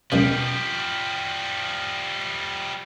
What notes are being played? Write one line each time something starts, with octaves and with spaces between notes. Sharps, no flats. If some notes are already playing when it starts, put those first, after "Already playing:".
C#2 F#2 B2 F3 G3